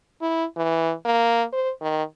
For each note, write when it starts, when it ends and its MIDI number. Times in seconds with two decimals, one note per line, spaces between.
0.22 0.45 64
0.57 0.93 52
1.05 1.44 58
1.53 1.70 72
1.82 2.03 51